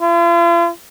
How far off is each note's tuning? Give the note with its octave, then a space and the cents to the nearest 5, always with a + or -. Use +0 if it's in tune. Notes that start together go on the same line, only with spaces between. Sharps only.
F4 -45